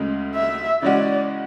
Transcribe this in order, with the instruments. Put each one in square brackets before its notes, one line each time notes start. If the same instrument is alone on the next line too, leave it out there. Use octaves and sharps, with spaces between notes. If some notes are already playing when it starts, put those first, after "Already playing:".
Already playing: [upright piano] D2 C#3 G#3
[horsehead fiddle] E5
[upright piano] C#3 E3 G#3 C#4 F#4 [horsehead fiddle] D5